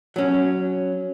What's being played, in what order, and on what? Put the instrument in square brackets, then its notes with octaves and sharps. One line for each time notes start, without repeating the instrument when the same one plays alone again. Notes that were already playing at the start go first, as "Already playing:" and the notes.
[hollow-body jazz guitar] F#3 C#4